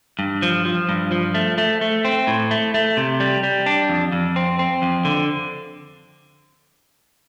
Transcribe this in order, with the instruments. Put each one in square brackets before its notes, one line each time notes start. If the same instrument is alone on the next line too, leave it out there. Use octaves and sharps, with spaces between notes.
[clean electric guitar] G2
F3
F3
G2
F3
A3
A3
A3
C4
A2
A3
A3
C3
G3
G3
D4
F2
F2
C4
C4
F2
D3